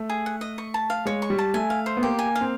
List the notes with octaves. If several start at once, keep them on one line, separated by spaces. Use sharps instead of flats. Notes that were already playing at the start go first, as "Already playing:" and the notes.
Already playing: A3
G#4
F#5
D#5
C#6
A5
F5
G#3 C#5
C#6
G3
A5
A3 G#5
F5
C5
B3
A#3 G4
G#5
F5
C4